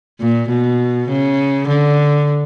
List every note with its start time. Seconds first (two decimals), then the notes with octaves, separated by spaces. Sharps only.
0.20 A#2
0.49 B2
1.09 C#3
1.68 D3